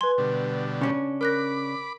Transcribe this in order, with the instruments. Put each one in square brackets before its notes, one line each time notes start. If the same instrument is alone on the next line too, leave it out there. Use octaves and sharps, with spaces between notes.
[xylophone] B4 C6 [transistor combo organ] G#5
[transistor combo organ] B2 D3 G3
[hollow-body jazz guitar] C#3 C#4 D4
[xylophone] A#4 F#6 A#6 [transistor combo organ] B5 D6